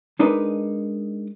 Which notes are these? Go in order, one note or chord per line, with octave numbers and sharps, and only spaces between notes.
G#3 D4 D#4 A#4 B4 D#5